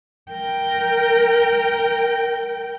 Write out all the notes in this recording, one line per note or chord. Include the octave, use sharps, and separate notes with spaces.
A#4 G5